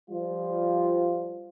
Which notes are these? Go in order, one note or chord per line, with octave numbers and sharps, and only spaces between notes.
F3 G3 F4